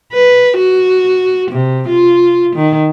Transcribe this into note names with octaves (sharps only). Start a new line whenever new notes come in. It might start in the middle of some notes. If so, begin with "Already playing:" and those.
B4
F#4
C3
F4
D#3